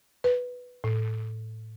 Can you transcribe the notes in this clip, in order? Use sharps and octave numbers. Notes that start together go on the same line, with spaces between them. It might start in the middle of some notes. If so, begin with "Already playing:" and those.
B4
A2